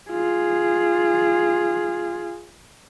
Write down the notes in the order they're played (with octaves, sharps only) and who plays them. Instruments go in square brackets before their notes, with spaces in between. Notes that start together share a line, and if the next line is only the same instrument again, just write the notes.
[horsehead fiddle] F4 G#4